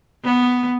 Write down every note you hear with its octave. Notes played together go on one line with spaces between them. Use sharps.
B3